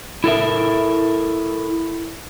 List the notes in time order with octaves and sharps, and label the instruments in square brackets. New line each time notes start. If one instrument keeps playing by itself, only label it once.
[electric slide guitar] E4 A4 A#4 E5